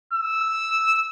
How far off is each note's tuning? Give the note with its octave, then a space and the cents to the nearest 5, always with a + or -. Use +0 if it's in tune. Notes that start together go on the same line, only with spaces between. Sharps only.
E6 -5